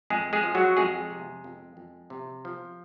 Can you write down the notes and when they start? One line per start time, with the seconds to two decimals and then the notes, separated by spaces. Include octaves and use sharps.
0.10 F2 G#3 G#4
0.33 G#3 G#4
0.43 F3
0.55 F#3 F#4
0.77 F2 G#3 G#4
1.10 C3
1.44 F2
1.77 F2
2.10 C3
2.45 F3